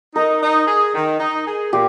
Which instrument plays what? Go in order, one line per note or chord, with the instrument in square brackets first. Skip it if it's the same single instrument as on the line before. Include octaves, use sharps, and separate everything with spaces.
[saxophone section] D#4 [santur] A#4
[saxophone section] D#4
G#4
D#3
D#4
G#4
[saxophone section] A#2 [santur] G4